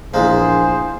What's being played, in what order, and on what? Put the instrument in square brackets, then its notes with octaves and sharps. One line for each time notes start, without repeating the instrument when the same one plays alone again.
[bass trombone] A#1 [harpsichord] E2 G#3 A#3 [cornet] G#4 [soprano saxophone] C5